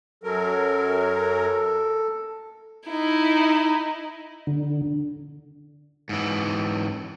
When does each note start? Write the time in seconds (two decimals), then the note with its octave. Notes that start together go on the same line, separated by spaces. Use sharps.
0.24 F#2 F#3 A4 A#4
2.89 D#4 E4
4.47 D3
6.09 G#2 E3